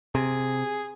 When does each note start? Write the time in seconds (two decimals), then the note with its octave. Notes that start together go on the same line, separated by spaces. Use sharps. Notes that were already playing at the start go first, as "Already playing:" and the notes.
0.15 C3 G#4